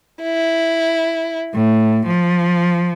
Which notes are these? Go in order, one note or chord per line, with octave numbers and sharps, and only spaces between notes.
E4
A2
F3